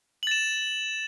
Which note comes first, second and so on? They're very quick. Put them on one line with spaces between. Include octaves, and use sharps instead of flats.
F#7 A6 E7